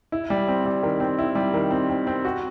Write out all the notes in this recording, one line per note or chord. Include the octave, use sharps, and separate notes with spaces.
E4
G3
C4
G3
D#3
C4
E4
G3
D#3
C4
C4
C4
F#4